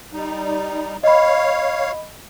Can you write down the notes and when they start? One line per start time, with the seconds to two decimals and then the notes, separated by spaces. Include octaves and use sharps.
0.13 G3 D#4
1.04 C#5 D#5 F5 B5